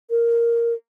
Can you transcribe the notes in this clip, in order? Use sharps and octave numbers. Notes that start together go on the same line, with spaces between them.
A#4